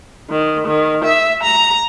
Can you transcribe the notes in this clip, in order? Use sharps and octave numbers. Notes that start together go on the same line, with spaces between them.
D#3
D#3
E5
A#5